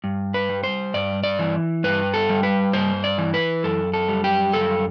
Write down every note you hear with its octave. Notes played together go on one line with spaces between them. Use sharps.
G2
B4
G3
C5
G2 D5
D5
E3
G2 B4
A4
G3
B4
G2 C5
D5
E3
B4
F#2 A4
A4
G3
G4
F#2 A4